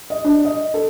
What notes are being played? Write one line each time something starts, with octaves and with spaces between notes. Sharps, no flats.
D#5
D4
D#5
A4